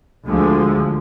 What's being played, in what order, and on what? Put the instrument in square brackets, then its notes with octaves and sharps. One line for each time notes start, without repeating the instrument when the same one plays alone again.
[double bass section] D2 D3 F3 G#3